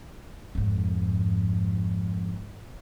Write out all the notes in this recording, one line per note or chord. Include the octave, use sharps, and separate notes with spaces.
F2 G#2